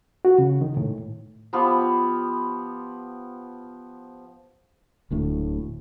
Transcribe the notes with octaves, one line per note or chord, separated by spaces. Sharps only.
F#4
C#3
D#3
A2
F3 B3 G4 B4
D1 D2 A2